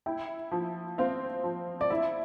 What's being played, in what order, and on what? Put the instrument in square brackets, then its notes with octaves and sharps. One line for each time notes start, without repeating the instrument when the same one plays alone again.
[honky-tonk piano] E4 [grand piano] G5
[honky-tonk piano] F3
[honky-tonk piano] C4 [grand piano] F5
[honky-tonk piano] F3
[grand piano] D5
[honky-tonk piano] E4 [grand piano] E5